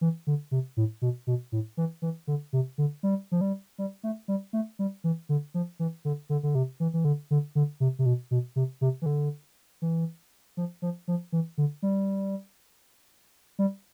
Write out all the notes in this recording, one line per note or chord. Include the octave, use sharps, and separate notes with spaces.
E3
D3
C3
A2
B2
B2
A2
E3
E3
D3
C3
D3
G3
F3
G3
G3
A3
G3
A3
G3
E3
D3
F3
E3
D3
D3
D3
C3
E3
E3
D3
D3
D3
C3
C3
B2
B2
C3
C3
E3
D3
E3
F3
F3
F3
E3
D3
G3
G3